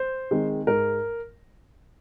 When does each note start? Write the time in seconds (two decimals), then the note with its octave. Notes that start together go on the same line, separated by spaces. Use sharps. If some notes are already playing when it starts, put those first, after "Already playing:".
Already playing: C5
0.31 D#3 G#3 C4
0.67 G#2 A#4